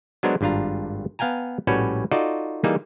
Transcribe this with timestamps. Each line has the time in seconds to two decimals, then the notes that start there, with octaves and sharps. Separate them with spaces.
0.23 F#3 G#3 B3 D4 A#4 C5
0.41 G#1 G2 D4 F4 A#5
1.19 B3 F5 G5 G#5 A#5
1.67 A#1 A2 G3 C#4 F#4 B4
2.12 D#4 F4 F#4 A4 D5 D#5
2.64 E3 G3 A#3 D#4 G#4